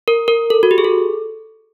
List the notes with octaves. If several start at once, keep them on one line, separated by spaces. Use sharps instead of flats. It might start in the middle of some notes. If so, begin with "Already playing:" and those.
A#4
A#4
A4
F#4
G4
G#4
A4